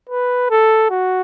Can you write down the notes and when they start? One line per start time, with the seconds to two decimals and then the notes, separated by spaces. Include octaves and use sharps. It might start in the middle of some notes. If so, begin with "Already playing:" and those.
0.10 B4
0.51 A4
0.90 F#4